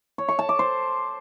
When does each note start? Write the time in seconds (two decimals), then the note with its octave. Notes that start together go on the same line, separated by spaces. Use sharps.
0.18 C#5
0.28 C#6
0.39 A5
0.49 D6
0.59 C5